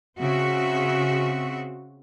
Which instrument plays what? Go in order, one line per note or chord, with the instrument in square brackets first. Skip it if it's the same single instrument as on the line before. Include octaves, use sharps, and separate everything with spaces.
[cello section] C#3 C4 F#4 E5